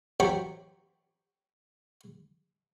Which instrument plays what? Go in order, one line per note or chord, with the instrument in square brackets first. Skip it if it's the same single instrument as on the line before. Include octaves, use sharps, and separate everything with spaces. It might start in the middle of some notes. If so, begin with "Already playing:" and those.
[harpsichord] A1 F#3 G4 C5 B5 C#6